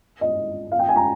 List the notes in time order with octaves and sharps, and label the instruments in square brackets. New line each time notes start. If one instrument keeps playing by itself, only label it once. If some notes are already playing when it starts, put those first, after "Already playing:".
[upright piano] D#5
F5
G5
G#5
A#5